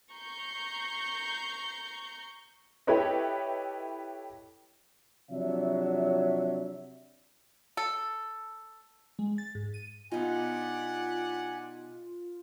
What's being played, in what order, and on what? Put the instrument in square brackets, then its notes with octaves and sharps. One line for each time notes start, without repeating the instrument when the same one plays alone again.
[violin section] A#5 C#6 G6 C7
[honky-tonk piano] E4 G4 A4 B4 C#5 D#5
[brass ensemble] C3 F3 F#3 D4 C#5 E5
[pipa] A4
[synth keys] G#3
A6
G#2
D#7
[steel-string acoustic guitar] B2 D#4 [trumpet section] D4 G4 F#5 [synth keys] F4 [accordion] G#5